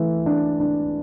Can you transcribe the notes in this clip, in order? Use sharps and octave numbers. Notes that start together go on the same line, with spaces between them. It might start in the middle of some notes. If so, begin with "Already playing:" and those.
Already playing: E3 A3
D4
D4